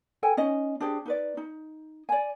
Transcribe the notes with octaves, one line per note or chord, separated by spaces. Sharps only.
A4 G5 G#5
C#4 D#4 D#5
D4 G4 G#4 C5
D#4 B4 D5
D#4
D5 G#5